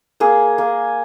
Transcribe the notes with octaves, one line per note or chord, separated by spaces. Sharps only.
A#3 G#4
A#3